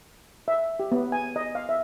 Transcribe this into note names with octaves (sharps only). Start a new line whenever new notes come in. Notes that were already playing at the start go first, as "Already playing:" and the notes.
E5
G4
B3
G#5
D#5
F5
E5